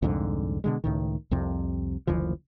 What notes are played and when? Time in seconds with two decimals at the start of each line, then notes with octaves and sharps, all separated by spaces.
0.02 C2 F2 G#2 D3
0.64 B2 D3 G#3
0.84 C#2 A2 D#3
1.31 C2 F2 C3
2.07 F#1 D2 E3 F3